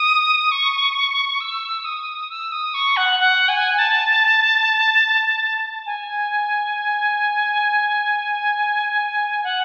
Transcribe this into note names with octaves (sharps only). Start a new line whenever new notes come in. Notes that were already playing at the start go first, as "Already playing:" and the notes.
Already playing: D#6
C#6
E6
D#6
E6
D#6
C#6
F#5
F#5
G#5
A5
G#5
F#5